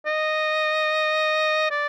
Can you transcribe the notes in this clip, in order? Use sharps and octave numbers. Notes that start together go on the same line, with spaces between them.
D#5
D5